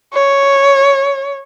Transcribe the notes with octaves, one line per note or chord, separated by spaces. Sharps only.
C#5